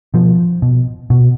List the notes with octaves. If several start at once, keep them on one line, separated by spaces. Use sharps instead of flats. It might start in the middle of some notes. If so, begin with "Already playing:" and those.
B2 F3
B2
B2